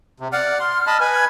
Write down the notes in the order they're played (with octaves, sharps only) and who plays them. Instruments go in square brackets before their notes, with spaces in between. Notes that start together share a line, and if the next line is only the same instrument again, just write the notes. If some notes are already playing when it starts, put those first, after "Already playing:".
[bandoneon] C3
[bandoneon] D5 F#5 [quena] F6
[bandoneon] C6
D#5 A5 B5
B4 G#5
[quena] G#6